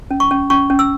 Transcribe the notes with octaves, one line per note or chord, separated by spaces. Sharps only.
C#4
C#6
C#4
C#4 C#6
C#4
E6